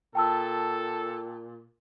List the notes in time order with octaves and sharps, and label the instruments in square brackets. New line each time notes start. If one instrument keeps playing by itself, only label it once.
[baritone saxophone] A#2 [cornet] A4 [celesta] G5 A5 E6